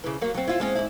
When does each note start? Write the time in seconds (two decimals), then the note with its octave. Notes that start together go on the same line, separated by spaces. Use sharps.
0.04 C#3 E3
0.21 F#3 A#3
0.34 F#3 C4
0.48 E4 F4
0.60 G#3 C4 C#4
0.75 G#2 E4